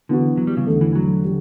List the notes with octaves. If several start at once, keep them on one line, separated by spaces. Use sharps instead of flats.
D3 E3 B3 F#4
F#3
G3
C#3
E2 D3 A3
E3
F#3
D3 G3